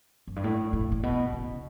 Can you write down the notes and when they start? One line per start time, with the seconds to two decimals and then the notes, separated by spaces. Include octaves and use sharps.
0.27 F#2
0.36 G2
0.44 A2
0.73 A2
0.92 A2
1.03 B2
1.33 C#3